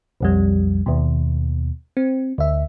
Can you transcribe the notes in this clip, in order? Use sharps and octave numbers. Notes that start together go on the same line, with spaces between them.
B1 F2 G3
D#2 B2
C4
D2 E5